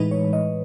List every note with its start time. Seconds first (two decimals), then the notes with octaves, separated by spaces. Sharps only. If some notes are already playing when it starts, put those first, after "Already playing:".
Already playing: A2 E3 G#3 D#4 B4
0.11 C#5
0.33 D#5